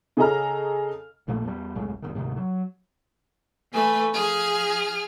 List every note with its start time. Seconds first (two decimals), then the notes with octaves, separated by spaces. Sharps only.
0.17 C#3 G#4 A4 D#5 A#5 F6
1.28 A#1 A#2 F3 A3
1.44 E2 F3 G3
1.75 F#1 C2 A2 G#3
2.02 F1 A#1 D#3
2.15 D2 G#2 C3 D#3
2.37 F#3
3.71 E3 A3 B4 G#5
4.12 F3 G#4 F6